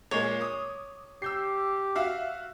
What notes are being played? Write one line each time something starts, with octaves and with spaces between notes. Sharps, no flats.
A#2 G#3 A#3 C#5
D6 D#6
G4 E6 G6 C7
F#4 E5 F5